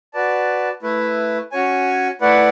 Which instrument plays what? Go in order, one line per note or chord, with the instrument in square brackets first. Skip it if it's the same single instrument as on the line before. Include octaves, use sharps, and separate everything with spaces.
[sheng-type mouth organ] F#4 B4 D5 A5
A3 E4 B4
C#4 F#4 C#5 G#5
A3 E4 B4 D5 F#5